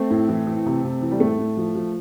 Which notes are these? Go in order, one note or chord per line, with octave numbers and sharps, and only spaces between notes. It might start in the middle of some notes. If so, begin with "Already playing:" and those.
Already playing: A3 C4
A2
E3
E3
C3
C3
E3
G3
A2 A3
A2
F3
F3